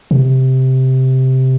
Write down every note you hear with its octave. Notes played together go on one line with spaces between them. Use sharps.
C3